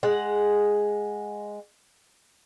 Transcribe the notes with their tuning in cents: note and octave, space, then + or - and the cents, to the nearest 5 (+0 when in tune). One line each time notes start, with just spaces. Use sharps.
G#3 +0 F#5 +0